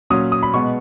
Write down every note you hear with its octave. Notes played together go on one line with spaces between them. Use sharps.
A#2 F#3 C#4 D#6
D#6
B5
B2 G#3 B3 C#6